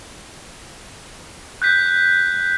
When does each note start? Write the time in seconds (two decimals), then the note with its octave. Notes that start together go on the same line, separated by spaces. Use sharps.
1.62 F#6 G6 B6